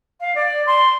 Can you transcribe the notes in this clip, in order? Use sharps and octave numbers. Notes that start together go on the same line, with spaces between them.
F5
D5
C6